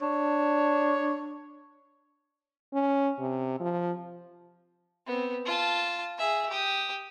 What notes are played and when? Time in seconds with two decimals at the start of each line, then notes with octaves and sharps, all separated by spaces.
0.02 D4 C#5
2.74 C#4
3.19 C3
3.60 F3
5.06 B3 C4
5.45 F4 A5
6.18 G#4 E5
6.49 G4 D#6